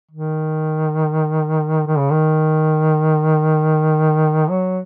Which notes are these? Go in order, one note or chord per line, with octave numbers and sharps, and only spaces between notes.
D#3
D#3
C#3
D#3
F#3